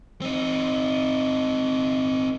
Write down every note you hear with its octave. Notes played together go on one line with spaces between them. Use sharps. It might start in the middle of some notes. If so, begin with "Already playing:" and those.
C4 D#4